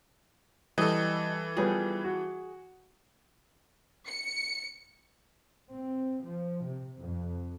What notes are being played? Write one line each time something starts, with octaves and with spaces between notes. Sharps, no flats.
E3 G3 A4 D#5
F3 G3 B3 G#4
F#4
C#7
C4
F3
C3
F2